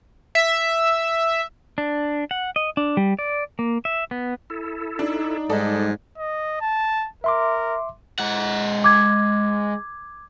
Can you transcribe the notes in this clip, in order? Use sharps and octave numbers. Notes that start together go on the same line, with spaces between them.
E5
D4
F#5
D#5
D4
G3
D5
A#3
E5
B3
E4 A4
D4 D#4
G#2 G3 G#3 A4 D5 D#5
D#5
A5
A#4 E5 C6 D6
G#3 F#5
D6 G#6